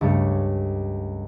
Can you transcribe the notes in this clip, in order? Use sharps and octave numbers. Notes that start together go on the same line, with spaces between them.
C#2 G2 G3 A3 C#5 C#7